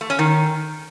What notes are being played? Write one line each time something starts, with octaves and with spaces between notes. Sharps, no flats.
A3
C#4
D#3